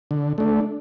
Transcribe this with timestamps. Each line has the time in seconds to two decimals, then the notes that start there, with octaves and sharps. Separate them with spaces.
0.11 D3
0.38 A3 D4